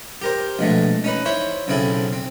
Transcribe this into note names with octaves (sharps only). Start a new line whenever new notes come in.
G4 A#4 C5
A#1 B2 G#3 A3
C#4 D#4 B4
E4 C5 C#5 E5
B1 C#3 C4 E4 G#4 A4
C4